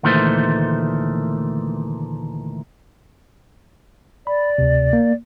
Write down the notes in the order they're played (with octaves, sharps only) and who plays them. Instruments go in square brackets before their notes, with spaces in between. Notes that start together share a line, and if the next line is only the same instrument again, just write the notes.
[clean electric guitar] D2 A#2 D#3 E3 A3 C5
[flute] D5 [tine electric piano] B5
[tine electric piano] D2 C3
A#3